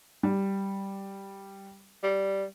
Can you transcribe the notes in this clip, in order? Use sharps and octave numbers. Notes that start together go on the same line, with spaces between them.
G3
G3